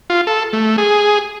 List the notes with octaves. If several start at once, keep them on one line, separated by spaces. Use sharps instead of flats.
F4
A4
A3
G#4